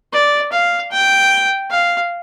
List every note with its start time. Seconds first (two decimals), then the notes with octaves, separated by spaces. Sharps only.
0.13 D5
0.52 F5
0.91 G5
1.70 F5